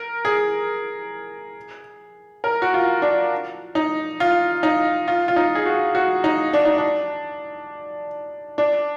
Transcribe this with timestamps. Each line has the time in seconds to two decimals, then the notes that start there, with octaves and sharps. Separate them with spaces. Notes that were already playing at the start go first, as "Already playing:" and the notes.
Already playing: A#4
0.25 G#4
2.44 A#4
2.62 F#4
2.74 F4
3.02 D4
3.75 D#4
4.20 F4
4.63 D#4
5.08 F4
5.28 F4
5.36 D#4
5.55 G#4
5.65 F#4
5.95 F#4
6.24 D#4
6.53 D4
6.65 D#4
6.78 D4
8.58 D4